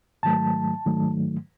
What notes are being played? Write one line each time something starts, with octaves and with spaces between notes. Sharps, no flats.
G#2 D#3 F#3 A3 A5
G#2 D#3 F#3 A3